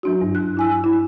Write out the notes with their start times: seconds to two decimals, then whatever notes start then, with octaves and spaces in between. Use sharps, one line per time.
0.03 F#3 D4 F#4
0.22 G2
0.35 F#6
0.57 E4 G#5 E6
0.84 E4